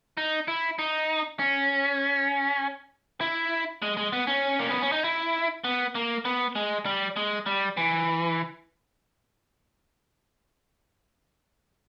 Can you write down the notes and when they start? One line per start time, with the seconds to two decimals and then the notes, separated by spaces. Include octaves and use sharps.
0.17 D#4
0.48 E4
0.79 D#4
1.39 C#4
3.21 E4
3.82 G#3
3.97 G#3
4.13 B3
4.27 C#4
4.59 A#3
4.70 B3
4.82 C#4
4.92 D#4
5.04 E4
5.64 B3
5.95 A#3
6.25 B3
6.56 G#3
6.86 G3
7.16 G#3
7.46 G3
7.77 E3